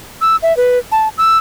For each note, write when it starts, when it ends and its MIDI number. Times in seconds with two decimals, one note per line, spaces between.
0.21 0.36 88
0.42 0.55 76
0.57 0.78 71
0.92 1.09 81
1.18 1.38 88